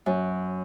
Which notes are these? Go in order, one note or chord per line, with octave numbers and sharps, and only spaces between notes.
F#2